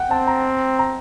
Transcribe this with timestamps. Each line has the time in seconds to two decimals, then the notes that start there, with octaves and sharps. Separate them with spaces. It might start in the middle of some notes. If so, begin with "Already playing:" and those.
Already playing: F#5 G5
0.10 C4 A5
0.27 A#5
0.79 A#5